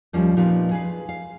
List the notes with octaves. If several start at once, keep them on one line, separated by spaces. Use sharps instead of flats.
D#2 F3 G3 C#4
A#2 F3 C4 D#4 B4
G#4 B4 F5
F5